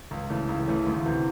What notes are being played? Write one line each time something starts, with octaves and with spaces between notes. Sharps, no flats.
C#2
C#3 E3 A3
C#2
C#3 E3 A3
D2
C3 E3